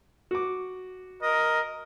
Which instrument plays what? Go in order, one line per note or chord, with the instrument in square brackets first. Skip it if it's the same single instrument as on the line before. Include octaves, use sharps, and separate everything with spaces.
[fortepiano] F#4 D6
[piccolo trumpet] A#4 [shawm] D#5